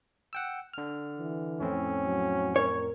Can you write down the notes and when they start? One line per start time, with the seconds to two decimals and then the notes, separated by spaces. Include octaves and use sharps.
0.33 F#5 G5 E6
0.74 D3 F6
1.18 E3
1.60 F2 A2 C4 C#4
2.04 F#3
2.56 A#4 C#5